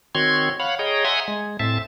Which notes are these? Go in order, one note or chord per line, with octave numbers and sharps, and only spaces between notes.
D#3 C4 F#4 C#5 C6 G#6
C#5 F5 F#5 B5
G#4 C#5 D#5 G5 A#5
E5 F#5 G#5 A#5 C6 D#6
G#3
A2 C4 E5 A5